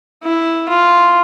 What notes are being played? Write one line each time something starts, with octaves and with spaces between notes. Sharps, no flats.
E4
F4